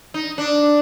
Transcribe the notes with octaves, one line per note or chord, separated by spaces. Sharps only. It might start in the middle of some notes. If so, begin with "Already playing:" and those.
D#4
D4